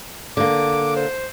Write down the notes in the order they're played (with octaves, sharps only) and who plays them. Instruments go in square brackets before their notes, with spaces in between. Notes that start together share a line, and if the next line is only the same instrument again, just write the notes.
[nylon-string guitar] D3 A#3 [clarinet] D6
[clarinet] C5